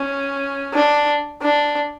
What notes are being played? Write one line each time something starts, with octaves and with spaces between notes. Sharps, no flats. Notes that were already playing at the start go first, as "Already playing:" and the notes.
Already playing: C#4
D4
D4